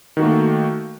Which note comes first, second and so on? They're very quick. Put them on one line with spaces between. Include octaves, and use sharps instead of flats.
D#3 F#4 A#3 A3